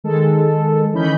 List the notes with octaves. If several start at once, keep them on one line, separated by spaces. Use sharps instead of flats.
D#3 G#3 A4
D#3 E3 C#4 D#5 B5 G6